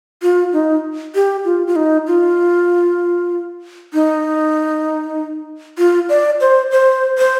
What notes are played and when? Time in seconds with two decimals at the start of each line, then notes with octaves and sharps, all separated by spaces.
0.22 F4
0.53 D#4
1.15 G4
1.45 F4
1.67 F4
1.76 D#4
2.07 F4
3.94 D#4
5.78 F4
6.09 D5
6.41 C5
6.71 C5
7.18 C5